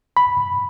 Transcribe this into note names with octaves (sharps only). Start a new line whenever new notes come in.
B5